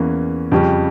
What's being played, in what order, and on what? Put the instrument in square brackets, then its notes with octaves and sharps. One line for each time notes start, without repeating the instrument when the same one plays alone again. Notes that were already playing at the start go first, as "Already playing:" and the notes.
Already playing: [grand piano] E2 E3 A#3 C#4
F2 C#3 G3 C#4 G4